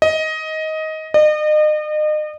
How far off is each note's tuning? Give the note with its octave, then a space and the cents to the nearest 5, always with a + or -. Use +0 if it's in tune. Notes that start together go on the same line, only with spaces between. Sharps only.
D#5 +15
D#5 -35